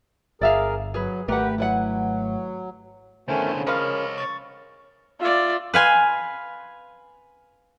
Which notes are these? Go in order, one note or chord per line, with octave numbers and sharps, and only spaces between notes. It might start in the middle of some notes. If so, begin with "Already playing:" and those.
G1 G#4 A#4 D5 E5 F5
F#3 G#4 B4
G#1 A3 G4 A#4 B4 F#5
F#3 E4 B4 F#5
E2 D3 D#3 A3 C#4 C5 G#5
C#3
F3 A#4 C#5 D#5 F5 B5
C#6 A6
F4 D5 E5
B4 F5 G#5 C6